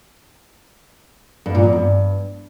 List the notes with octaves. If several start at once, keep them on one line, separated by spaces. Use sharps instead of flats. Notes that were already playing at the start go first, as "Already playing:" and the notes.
G2
A#2
E2
G2